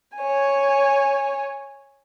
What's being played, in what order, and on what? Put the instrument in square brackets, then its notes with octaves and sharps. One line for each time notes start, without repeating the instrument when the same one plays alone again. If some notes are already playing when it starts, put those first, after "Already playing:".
[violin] C#5 G#5